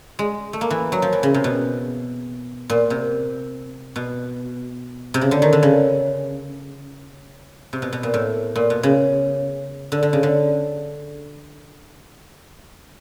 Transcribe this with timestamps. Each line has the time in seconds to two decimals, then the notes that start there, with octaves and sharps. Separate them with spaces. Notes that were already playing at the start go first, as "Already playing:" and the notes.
0.19 G#3
0.53 A3
0.61 A#3
0.70 E3
0.92 F#3
1.02 F3
1.13 E3
1.23 C#3
1.34 C3
1.44 B2
2.70 A#2
2.90 C3
3.96 B2
5.14 C3
5.21 C#3
5.31 D3
5.42 D#3
5.53 D3
5.63 C#3
7.73 C3
7.82 B2
7.93 B2
8.03 A#2
8.14 A2
8.56 A#2
8.70 B2
8.83 C#3
9.92 D3
10.03 D3
10.13 C#3
10.23 D3